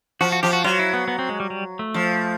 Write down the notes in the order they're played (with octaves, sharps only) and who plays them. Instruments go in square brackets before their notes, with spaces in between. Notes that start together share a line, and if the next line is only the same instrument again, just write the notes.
[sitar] F3 [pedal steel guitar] F#4
[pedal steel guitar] F#4
[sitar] F3 [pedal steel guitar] G4
[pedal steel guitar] F#4
[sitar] F#3 [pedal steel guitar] F4
[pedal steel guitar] E4
B3
B3
C4
G#3
G3
G3
A3
[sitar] F3